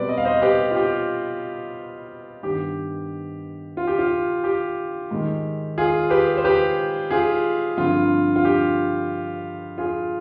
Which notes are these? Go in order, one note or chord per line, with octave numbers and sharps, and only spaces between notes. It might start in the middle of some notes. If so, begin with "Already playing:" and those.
Already playing: B2 G3 C4 B4 D5
D#5
F5
C5 D#5
G4 B4
F4
G4
G2 D#3 B3 G4
F4
G4
F4
G4
G#2 D#3 G#3
F4 G#4
G4 B4
C5
G4 B4
F4 G#4
G2 D3 F3 C4 F4
F4
G4
F4 G#4